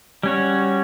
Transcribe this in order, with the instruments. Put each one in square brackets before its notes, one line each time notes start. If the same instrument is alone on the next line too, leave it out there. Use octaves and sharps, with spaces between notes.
[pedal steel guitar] G3 C#4 F#4 C#5